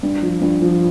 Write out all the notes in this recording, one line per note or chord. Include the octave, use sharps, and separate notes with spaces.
G2
F3
G2
F3